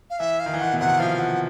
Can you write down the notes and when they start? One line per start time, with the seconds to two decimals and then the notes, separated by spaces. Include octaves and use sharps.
0.10 F5
0.19 E3 E5
0.40 F5
0.46 D#3
0.54 E3
0.60 D#3 F#5
0.73 B2
0.80 C3 F#5
0.89 B2
0.99 F3 F5
1.19 F#5